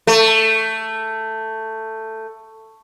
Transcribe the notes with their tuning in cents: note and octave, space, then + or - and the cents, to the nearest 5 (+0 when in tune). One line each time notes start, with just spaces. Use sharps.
A3 +10